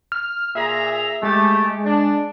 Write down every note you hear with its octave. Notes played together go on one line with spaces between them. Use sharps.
F6
A#2 G#4 E5 A#5
G#3 A3 G4
D4